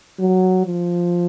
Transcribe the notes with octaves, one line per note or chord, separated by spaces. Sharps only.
F#3
F3